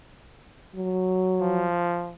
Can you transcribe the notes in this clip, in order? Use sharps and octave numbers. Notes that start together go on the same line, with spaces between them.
F#3
F3